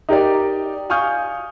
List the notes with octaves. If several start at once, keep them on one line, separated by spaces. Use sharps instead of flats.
D#4 G4 A#4 D5
F5 G#5 C#6 D#6 F6 G6